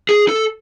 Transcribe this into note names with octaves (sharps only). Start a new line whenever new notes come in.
G#4
A4